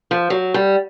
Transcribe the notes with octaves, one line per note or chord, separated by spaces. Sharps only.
F3
F#3
G3